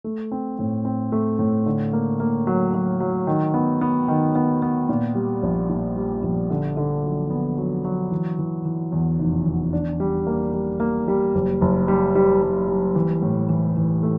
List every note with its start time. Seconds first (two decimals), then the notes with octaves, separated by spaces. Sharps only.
0.04 A3
0.32 C4
0.59 A2
0.85 C4
1.12 A3
1.39 A2
1.66 D3
1.93 A#3
2.20 A#3
2.47 F#3
2.74 F#3
3.00 F#3
3.27 D#3
3.54 B3
3.81 B3
4.08 D#3
4.35 B3
4.62 B3
4.89 A#2
5.15 G3
5.43 A#1
5.69 A#2
5.96 G3
6.23 A#1
6.50 D3
6.77 D3
7.03 F#3
7.30 B3
7.58 F#3
7.85 F#3
8.11 E3
8.39 E3
8.65 E3
8.92 E2
9.19 F1
9.46 E2
9.73 D4
10.00 G3
10.27 A#3
10.54 G3
10.80 A#3
11.08 G3
11.35 F#1
11.61 F#1
11.88 G3
12.15 G3
12.42 G3
12.68 G3
12.95 E3
13.22 A2
13.49 E3
13.77 E3
14.03 A3